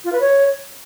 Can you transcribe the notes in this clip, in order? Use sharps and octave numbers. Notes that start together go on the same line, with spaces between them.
F4
B4
C#5